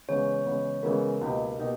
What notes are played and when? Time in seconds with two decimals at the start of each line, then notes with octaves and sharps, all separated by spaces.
0.08 C#3 E3 G#3 B3 C#5
0.46 C#3 E3 G#3 B3
0.83 C#3 E3 G#3 B3 A#4
1.21 C#2 B2 A#3 D#4 G4
1.59 B2 A#3 D#4 G4